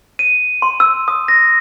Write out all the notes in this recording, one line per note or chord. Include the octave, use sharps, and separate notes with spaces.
D#7
C6
E6
D#6
A#6